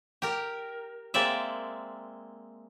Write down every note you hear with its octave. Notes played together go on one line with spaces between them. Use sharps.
G4 A#4
G#3 A#3 C4 D5 E5